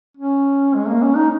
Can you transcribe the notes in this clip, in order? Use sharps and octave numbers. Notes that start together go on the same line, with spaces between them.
C#4
G#3
A#3
C#4
D#4